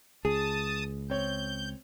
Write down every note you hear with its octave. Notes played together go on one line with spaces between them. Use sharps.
C#2 G#4 A5 D#6
C4 C#5 G6